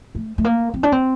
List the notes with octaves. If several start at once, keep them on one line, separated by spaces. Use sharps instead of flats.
A3
A3
A#3
C4
D4
C4